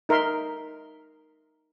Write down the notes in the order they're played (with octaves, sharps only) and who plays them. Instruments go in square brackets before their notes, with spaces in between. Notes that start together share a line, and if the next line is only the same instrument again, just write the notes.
[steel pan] D#4 A#4 E5 C6